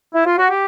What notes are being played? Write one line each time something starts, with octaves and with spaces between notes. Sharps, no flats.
E4
F4
F#4
G4